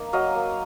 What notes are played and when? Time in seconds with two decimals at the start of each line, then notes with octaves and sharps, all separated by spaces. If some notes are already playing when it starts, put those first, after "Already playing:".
Already playing: A#3 D#4
0.13 F#3 D#5 F5
0.35 A#3